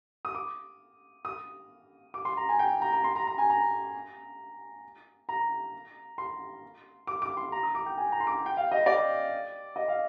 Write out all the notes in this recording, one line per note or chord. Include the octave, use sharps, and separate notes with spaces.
D#6
D6
D#6
D6
C6
A#5
G#5
G5
A#5
A#5
C6
A#5
A#5
G#5
A#5
A#5
C6
D6
D6
C6
A#5
D#6
D6
G5
G#5
A#5
C6
D6
G5
F5
D#5
D5
D#5
F5